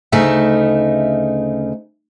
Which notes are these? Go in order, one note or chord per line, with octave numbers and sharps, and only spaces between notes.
D2 C#3 A3 D#4 E5